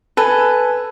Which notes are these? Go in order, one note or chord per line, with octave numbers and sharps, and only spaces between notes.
A4 B4 G#5